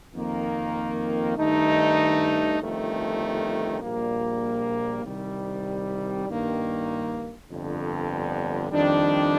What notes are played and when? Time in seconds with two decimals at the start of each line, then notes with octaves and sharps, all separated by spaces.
0.14 F2 D#3 A#3
1.37 G2 D#3 A3 D#4
2.59 G1 F2 D#3 A3
3.82 A#1 A#2 G3 A#3
5.04 C2 C3 D#3 G3
6.27 G2 D#3 A#3
7.50 G1 F2 D3
8.72 F2 D#3 G3 D4